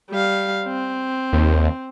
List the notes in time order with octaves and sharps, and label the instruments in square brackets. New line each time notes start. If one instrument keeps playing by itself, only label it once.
[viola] G3 F5
C4
[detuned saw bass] D#2